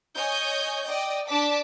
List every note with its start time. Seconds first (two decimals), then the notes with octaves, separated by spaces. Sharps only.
0.14 C#5 D#5 G#5 G6
0.86 D5 D#5 G5
1.28 D4 D5 A5 D6 B6